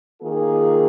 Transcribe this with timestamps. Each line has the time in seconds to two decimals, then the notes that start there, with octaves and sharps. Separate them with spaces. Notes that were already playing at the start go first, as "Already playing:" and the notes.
0.21 D#3 A#3 F4 G#4